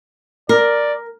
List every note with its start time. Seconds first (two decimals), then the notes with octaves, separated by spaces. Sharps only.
0.49 A#4 D5